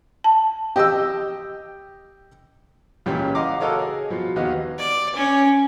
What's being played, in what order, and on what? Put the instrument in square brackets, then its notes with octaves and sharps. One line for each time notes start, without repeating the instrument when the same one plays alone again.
[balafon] A5
[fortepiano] G4 D#5 G5 E6
C#2 A#2 E3 C#4 G4 G5
D#5 F5 F#5 A#5 C6 D6
F#4 A4 A#4 C#5 D#5 F5
G#4
B2 F3
D#2 B3 F#4 G4 D#5 F5
[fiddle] D5
C#4